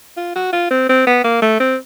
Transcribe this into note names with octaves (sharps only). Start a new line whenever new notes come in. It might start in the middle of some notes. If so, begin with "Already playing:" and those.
F4
F#4
F4
C4
C4
B3
A#3
A3
C4